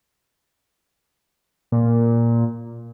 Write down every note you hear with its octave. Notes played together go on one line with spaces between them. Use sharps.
A#2